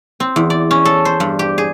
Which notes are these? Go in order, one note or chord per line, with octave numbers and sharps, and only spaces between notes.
C4
E2
D5
C#4
A4
C5
G2
G4
G#4